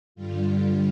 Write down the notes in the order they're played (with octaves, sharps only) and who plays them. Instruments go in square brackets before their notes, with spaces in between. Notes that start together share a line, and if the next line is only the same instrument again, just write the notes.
[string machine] G2 D3 G3 F4